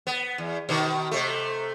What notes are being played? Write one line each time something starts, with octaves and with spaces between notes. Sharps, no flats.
B3
E2
B2 D#3
C3 A3